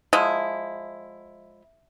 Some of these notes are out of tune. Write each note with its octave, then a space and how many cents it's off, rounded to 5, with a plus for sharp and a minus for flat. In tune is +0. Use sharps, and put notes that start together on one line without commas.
F3 +20 G#3 +0 E4 +0